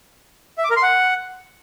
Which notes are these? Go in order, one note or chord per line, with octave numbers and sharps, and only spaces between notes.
E5
D6
A#4
C6
F#5